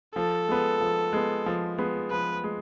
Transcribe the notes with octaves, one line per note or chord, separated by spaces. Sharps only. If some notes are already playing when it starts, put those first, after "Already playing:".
F3 A4
G#3 B3
F3
G#3 B3
F3
G#3 B3
F3 B4
G#3